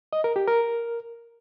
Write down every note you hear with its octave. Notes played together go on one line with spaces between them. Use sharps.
D#5
A#4
G4
A#4